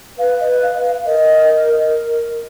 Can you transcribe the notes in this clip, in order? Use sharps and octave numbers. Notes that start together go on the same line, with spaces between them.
B4 F5
D#5
F5
F5
A#4 D#5